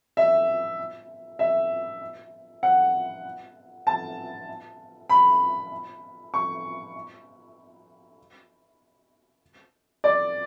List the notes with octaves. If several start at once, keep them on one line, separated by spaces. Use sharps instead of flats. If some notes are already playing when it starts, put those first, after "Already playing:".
E5
E5
F#5
A5
B5
C#6
D5